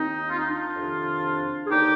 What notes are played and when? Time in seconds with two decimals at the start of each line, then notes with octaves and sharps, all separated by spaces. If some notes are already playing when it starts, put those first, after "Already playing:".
Already playing: D#2 D#3 C4 D#4
0.29 F4
0.38 D#4
0.45 D4 F4
0.76 F2 C3 D#3
1.65 G#4
1.70 D#2 D3 D#4 G4